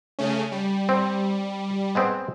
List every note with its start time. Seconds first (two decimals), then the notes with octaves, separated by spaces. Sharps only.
0.19 C#3 A3 C#4
0.52 G3
0.89 C4
1.95 G#3 B3 C4